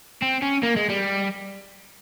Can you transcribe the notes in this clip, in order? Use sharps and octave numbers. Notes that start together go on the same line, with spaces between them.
C4
C#4
A#3
G#3
G3